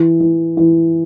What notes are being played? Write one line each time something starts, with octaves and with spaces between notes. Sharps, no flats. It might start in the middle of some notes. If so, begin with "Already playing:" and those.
Already playing: E3
E3
E3